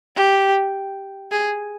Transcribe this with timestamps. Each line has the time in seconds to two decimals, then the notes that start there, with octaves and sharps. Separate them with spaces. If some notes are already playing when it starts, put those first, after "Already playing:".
0.16 G4
1.31 G#4